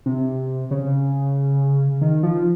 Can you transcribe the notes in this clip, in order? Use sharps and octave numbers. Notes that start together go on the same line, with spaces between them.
C3
C#3
D#3
F3